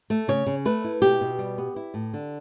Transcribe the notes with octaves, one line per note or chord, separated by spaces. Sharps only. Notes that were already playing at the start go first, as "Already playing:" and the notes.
A3
C#3 C#5
C#3
A3 B4
E4
B2 G4
B2
G3
B3
E4
A2
D3